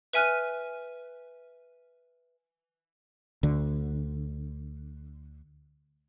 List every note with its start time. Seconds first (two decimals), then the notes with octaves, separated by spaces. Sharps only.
0.13 B4 E5 G#5 F6 F#6 D#7
3.43 D2 D3